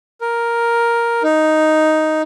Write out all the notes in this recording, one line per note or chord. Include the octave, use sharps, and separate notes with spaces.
A#4
D#4